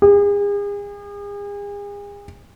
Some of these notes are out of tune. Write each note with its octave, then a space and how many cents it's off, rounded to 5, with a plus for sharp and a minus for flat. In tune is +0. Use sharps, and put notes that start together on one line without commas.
G#4 -40